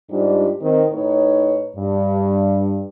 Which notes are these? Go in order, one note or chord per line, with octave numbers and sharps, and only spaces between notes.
G#2 G3 D4 F4 G4
D#3 C4
A2 D#4 B4 C#5
G2